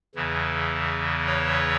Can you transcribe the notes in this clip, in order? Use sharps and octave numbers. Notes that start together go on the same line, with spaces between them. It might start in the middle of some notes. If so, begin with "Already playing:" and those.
E2 C#3 E3
C#5